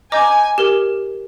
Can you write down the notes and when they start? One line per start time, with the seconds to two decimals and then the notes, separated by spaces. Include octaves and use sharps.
0.12 D#5 G#5 A#5 D6 G6
0.58 G4 A#4